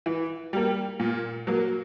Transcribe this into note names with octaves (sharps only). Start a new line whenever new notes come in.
E3
G3 A#3
A#2
F#3 A#3